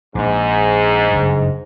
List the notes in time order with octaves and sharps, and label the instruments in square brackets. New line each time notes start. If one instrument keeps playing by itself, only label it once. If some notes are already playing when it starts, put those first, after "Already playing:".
[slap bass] A#1 [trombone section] G#2
[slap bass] F#1 G2